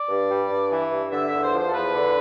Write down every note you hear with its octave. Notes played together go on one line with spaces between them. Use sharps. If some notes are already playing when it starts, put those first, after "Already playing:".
Already playing: D5
G2
G3
G2
E3
G2
D3 E5
E2 E5
C5
F3
C5
A4
E2 B4
D3